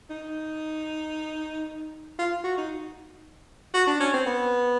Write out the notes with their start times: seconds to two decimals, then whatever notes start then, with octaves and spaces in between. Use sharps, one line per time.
0.10 D#4
2.19 F4
2.44 F#4
2.58 D#4
3.74 F#4
3.87 D4
4.00 C#4
4.14 C4
4.26 B3